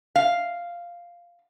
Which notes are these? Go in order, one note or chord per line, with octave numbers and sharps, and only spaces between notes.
F5